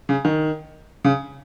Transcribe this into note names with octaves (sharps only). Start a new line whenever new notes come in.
C#3
D#3
C#3